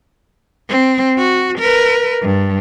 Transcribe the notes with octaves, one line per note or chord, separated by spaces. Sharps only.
C4
F#4
A#4 B4
G2